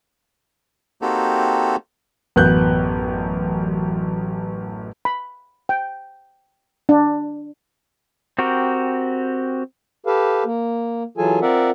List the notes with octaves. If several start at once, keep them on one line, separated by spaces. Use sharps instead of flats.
A#3 C4 D#4 F#4 G4 A4
A1 F#2 B3 F#6 G6
B5
G5
D4
C4 F#4 G4 A#4
G4 A4 B4 F5
A#3
E3 F#3 F4 G#4 A4 G#5
C4 F4 A#4 D5 E5 F#5